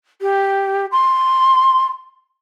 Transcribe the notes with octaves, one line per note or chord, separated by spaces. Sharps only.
G4
C6